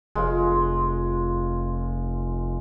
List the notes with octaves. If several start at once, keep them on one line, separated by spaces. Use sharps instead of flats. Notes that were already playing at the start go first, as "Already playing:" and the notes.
F1 G#3 F4